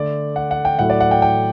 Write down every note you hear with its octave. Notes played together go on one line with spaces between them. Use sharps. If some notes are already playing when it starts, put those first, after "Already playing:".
Already playing: D3 A3 D5
F#5
F#5
G5
A2 F#3 A3 F#5
D5
F#5
G5
G5